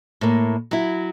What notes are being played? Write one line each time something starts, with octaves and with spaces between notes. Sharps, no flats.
A2 A#3
F#3 E4